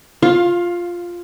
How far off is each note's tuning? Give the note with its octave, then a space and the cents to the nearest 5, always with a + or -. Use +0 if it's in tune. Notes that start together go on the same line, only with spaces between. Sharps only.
F4 +0 F5 +15 C6 +35